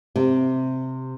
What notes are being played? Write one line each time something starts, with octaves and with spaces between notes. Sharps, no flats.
C3